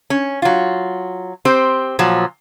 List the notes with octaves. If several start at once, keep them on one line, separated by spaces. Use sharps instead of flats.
C#4
F#3 F4
C4 G4 C5
A#2 F3 F#3